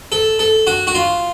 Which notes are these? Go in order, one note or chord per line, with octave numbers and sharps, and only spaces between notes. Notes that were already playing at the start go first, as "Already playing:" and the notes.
A4
A4
F#4
F#4
F4